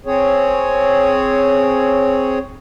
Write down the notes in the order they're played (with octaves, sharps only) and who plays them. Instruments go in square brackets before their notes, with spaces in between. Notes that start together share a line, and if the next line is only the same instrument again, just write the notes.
[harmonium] C4 G#4 C#5